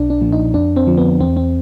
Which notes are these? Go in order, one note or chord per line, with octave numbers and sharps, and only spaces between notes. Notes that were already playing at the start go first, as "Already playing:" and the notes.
Already playing: B1 D4
D4
A#2 F3
D#4
F2 D4
C4
D3 F3
B3
E2 C4
C4